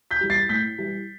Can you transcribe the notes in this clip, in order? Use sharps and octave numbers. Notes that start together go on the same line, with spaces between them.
G6 B6
E3 G3
A6 C7
A2 G6 B6
E3 G3